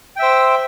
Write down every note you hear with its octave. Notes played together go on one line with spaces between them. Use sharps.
C5 E5 G5